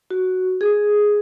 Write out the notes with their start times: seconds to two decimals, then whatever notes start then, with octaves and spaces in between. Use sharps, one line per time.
0.10 F#4
0.61 G#4